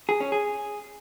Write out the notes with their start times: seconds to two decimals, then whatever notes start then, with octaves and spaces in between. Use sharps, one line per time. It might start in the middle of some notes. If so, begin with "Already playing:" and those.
0.09 G#4
0.20 C#4
0.32 G#4